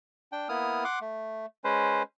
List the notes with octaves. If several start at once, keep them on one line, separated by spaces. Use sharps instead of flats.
D4 G5
A#3 B3 E4 D#6 F6
F#5 C6 D6
A3
G#3 C#4 B4 C5